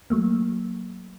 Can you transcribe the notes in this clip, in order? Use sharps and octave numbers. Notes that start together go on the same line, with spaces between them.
F#3 A3 A#3